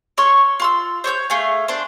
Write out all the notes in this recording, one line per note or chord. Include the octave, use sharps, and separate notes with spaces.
C#5 C6 C#6 F6
F4 C6 E6
C5 C#5 E6 G6
A3 G#4 F5
D4 C5